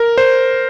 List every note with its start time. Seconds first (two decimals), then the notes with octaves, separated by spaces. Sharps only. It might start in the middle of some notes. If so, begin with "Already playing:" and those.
Already playing: A#4
0.18 C5